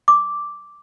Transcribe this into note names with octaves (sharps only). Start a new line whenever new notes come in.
D6